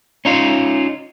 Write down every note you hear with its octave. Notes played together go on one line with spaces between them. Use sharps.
C#4 D#4 F4